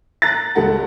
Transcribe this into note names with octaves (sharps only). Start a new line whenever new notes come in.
A#5 F#6 A6
C#2 G3 A4 F#5